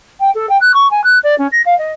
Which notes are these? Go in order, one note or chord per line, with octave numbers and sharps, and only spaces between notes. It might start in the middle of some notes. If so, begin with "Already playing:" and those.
G5
A4
G5
F#6
C#6
G#5
F#6
D5
C#4
A#6
F5
D#5